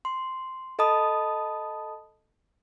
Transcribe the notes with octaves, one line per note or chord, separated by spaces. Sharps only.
C6
A4 D#5 A5 B5 D#6